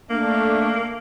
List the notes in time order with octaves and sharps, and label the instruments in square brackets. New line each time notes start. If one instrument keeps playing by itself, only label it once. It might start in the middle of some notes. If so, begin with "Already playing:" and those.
[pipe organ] A3 D4 [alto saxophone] A#3